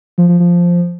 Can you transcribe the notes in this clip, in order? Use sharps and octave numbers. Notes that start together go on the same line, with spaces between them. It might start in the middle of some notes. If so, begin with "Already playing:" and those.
F3
F3
F3